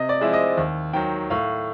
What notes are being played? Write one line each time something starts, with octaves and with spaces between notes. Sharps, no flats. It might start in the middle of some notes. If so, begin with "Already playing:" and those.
Already playing: C3 D#5
D5
F3 G#3 C4 E4
D#5
D#2
D#3 F#3 G5
A2 F5